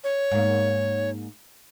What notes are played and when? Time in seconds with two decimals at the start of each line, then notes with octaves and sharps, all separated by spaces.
0.04 C#5
0.31 G#2 A#3